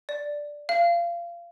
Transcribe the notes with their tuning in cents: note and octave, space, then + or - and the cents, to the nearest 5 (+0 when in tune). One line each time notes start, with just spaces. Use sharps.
D5 +0
F5 -25